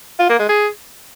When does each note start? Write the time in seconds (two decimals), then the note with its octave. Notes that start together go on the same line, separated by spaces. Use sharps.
0.19 F4
0.29 A#3
0.39 G#3
0.49 G#4